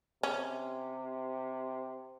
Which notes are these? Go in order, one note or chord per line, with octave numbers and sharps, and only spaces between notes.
C3 C#4